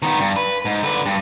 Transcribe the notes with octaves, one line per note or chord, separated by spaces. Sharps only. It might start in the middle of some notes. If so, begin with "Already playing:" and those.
D#3 B3
G2
B4
G#2
D3 B4
G2